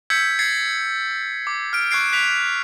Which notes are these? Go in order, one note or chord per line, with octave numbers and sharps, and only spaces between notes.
E6 G6 G#6 B6 C#7
G#6 A6 C7 C#7
D6
F6 D7
C#6 F#6 G#6 C7 D7
F#6 B6 F7